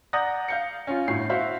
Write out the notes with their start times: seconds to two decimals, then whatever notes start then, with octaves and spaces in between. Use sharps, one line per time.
0.13 D5 F#5 A#5 D#6 G6 A#6
0.48 F5 G6 C#7
0.87 C#4 F4
1.08 G1 A2 F#4 C7
1.30 F#4 C5 E5 F5